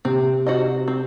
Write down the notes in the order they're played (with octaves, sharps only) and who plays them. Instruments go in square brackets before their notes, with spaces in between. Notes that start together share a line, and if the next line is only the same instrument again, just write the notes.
[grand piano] C3 [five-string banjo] C4
[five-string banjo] F#4 C5 D#5
C4